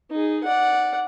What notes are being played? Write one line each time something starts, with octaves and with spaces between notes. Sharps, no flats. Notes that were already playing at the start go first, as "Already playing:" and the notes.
D#4 G#4
D5 F#5